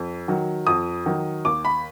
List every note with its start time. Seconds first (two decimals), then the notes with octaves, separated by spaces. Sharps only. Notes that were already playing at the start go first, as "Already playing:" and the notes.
Already playing: F2
0.28 D#3 F#3
0.67 F2 D#6
1.06 D#3 F#3
1.45 D#2 D6
1.65 B5